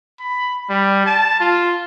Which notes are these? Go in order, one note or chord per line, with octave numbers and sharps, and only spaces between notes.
B5
G3
A5
F4